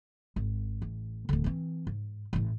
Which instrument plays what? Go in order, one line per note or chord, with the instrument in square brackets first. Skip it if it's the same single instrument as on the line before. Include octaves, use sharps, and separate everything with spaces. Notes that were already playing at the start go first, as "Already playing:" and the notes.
[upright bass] G#1
A1
D1 D3
E3 C4
G#2
A1 A2